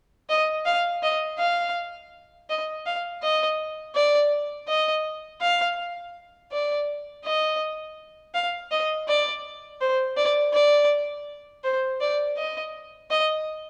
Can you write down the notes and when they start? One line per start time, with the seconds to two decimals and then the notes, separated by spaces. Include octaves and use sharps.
0.29 D#5
0.66 F5
1.03 D#5
1.39 F5
2.49 D#5
2.86 F5
3.23 D#5
3.95 D5
4.68 D#5
5.41 F5
6.52 D5
7.25 D#5
8.34 F5
8.71 D#5
9.08 D5
9.81 C5
10.17 D5
10.53 D5
11.64 C5
12.00 D5
12.37 D#5
13.10 D#5